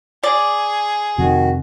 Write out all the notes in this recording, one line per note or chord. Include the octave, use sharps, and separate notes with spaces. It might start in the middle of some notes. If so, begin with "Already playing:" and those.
G#4 D5
F2 C3 D#3 F#4